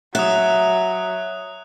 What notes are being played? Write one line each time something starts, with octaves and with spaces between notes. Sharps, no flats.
F#3 E5 D#6 F#6